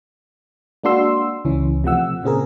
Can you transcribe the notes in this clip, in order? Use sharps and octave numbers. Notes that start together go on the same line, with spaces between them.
G#3 A#3 D4 F#4 C6 E6
C#2 E3 C#4
C3 F3 A3 F#5 E6
A#2 C#3 C4 G#4 A#4